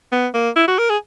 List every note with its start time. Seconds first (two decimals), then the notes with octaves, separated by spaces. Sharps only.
0.12 B3
0.34 A#3
0.56 E4
0.67 F#4
0.78 A#4
0.89 G#4